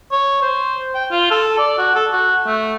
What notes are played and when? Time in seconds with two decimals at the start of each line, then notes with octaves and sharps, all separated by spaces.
0.12 C#5
0.42 C5
0.95 G5
1.11 F4
1.31 A4
1.58 D5
1.78 F#4
1.95 A4
2.13 F#4
2.46 A3